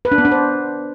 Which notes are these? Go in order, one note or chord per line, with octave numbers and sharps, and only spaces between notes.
B4
D4
B3
D4
C5